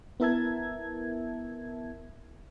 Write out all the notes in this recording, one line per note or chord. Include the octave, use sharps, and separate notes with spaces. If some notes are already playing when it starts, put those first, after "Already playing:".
B3 E4 A#4 E5 A5 G#6